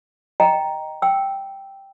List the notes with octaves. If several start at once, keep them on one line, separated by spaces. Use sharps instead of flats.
D#5 G5 A#5
G5 E6